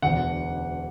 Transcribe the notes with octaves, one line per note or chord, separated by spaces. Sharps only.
E1 D2 D3 F#5